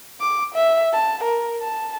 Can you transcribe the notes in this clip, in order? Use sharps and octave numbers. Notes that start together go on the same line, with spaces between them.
D6
E5
A5
A#4
A5